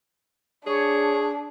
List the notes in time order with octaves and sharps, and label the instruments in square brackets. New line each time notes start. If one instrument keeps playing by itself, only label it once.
[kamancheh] D4 [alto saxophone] G#4 [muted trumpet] C#5